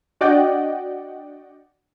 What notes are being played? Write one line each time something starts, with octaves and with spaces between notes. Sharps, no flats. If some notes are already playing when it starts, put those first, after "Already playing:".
D4 F#4 D5 D#5 F#5 G5